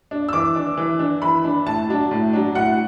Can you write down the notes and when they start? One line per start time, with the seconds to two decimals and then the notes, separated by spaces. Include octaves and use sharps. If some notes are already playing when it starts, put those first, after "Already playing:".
0.11 D4
0.29 E6
0.33 E3 D6
0.56 D4
0.77 E3
0.99 D4
1.22 E3 B5
1.44 D4
1.66 A2 A5
1.89 F#3 D4
2.11 A2
2.33 F#3 D4
2.55 A2 F#5